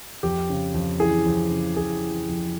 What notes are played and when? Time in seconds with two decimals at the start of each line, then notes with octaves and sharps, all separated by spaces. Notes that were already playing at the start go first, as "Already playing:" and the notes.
0.23 F2 G4
0.49 C#3
0.74 F2
1.00 E3 G#4
1.26 F2
1.51 C#3
1.76 F2 G#4
2.02 E3
2.29 F2